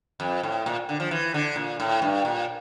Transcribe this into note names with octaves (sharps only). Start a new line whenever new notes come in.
F2
A2
A#2
D3
F3
E3
D3
A#2
A2
G2
A#2